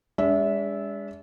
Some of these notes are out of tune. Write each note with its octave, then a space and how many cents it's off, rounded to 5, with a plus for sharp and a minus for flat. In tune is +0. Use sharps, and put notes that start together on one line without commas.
G#3 -35 D4 -40 E5 -10